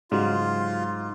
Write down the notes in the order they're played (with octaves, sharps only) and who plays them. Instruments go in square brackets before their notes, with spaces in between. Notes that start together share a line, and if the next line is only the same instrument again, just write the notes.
[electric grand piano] G#2 [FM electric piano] C#3 F#3 G3 [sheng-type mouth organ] F4